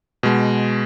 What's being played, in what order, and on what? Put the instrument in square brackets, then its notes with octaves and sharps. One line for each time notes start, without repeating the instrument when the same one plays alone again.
[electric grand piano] B2 G#3